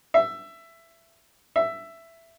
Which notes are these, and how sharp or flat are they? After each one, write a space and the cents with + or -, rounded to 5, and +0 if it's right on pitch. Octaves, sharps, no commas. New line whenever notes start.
E5 +15
E5 +10